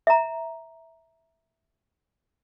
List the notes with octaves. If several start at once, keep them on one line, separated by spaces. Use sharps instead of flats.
E5 A#5